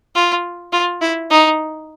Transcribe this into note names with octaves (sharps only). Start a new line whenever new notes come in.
F4
F4
E4
D#4